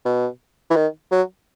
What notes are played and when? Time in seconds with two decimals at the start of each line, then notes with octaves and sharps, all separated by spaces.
0.05 B2
0.70 E3
0.76 D#3
1.11 F#3